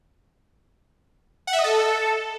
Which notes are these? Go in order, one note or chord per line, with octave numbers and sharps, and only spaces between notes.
F#5
E5
D#5
A4